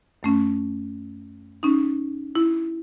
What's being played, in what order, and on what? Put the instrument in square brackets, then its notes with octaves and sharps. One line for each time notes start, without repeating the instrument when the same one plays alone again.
[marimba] F#2 A3 C#4
C#4 D#4
E4